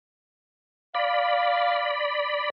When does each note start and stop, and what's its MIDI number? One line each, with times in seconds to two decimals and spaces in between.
0.95 2.50 74
0.95 2.02 77
0.95 2.50 83